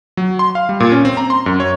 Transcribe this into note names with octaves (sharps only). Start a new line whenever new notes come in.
F#3
C6
F5
G3
A#2
C#4
C4
A#5
C6
F#2
C#5